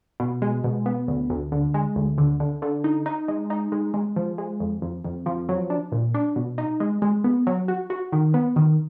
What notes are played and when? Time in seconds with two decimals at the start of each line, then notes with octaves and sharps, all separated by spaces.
0.20 B2
0.42 G#3
0.64 B2
0.86 B3
1.08 D2
1.30 D2
1.52 D3
1.74 G#3
1.96 D2
2.18 D3
2.40 D3
2.62 D3
2.84 D#4
3.06 D#4
3.28 G#3
3.50 D#4
3.72 G#3
3.94 G#3
4.16 F3
4.38 G#3
4.60 F2
4.82 F2
5.04 F2
5.26 F3
5.49 F#3
5.70 D4
5.92 A#2
6.14 D4
6.36 B2
6.58 D#4
6.80 G#3
7.02 G#3
7.24 B3
7.47 F#3
7.68 F#4
7.90 F#4
8.12 D#3
8.34 B3
8.56 D#3